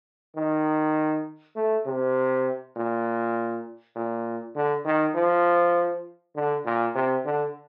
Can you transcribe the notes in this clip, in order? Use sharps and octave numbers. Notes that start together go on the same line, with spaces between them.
D#3
A3
C3
A#2
A#2
D3
D#3
F3
D3
A#2
C3
D3